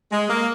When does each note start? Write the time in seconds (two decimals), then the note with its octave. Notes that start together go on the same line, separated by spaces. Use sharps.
0.12 G#3
0.30 A#3